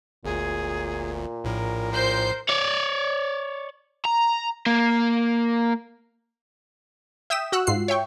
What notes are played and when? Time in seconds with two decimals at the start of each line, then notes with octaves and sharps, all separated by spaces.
0.25 G1 D2 A#2 G#4
1.44 A#1 A2 A#4
1.92 A#2 C5 G6 C7
2.49 C#5 D5
4.05 A#5
4.66 A#3
7.30 E5 G5 D#6 B6 E7
7.52 F#4 F#5 E6 F#6
7.67 G#2 F4 C7
7.88 C#5 E5 G5 C#6